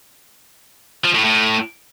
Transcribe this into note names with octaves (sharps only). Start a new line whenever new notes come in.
F3
A2
A2